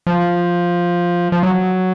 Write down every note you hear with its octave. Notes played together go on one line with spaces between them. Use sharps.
F3
F3
F#3